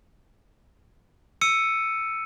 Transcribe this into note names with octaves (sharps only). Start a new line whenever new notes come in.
E6 C#7 D#7